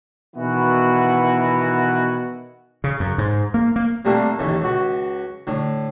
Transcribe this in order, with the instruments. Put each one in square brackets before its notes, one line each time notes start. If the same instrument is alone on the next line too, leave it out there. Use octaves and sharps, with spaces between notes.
[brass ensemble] B2 D#3 E3 B3 E4 F#4
[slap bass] C#3
F#2
G#2
A#3
A#3
[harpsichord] C3 G3 A3 A#3 D4
A1 D#2 C#3 A3
C#2 F#4
A2 D3